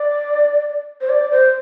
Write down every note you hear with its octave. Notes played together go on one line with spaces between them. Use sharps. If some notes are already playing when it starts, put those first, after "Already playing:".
Already playing: D5
C5
D5
C5